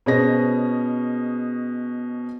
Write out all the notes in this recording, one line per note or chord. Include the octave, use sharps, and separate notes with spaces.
B2 C#4 G#4 C5 D#5 A#6